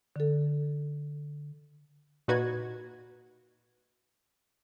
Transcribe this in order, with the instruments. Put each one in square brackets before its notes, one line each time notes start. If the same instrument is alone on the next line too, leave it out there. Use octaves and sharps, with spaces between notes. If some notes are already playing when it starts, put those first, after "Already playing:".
[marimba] D3 A4
[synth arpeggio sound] A#2 D#4 F#4 B4 G#6